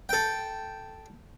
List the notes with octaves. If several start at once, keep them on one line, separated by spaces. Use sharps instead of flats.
A4 G5